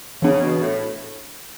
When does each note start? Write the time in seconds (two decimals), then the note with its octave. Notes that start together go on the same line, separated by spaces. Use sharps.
0.22 C#3 E3 B3 D4
0.41 B2
0.60 A2